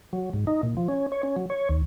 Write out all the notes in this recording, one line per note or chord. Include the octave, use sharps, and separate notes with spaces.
F#3
G#2
D#4
A#2
F3
C#4
C#5
C#4
F#3
C#5
D#2